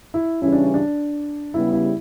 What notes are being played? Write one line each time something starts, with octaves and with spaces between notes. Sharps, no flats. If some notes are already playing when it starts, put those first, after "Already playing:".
E4
C#3 E3 G3 C#4 E4
D4
D4
C#3 G3 B3 E4
E4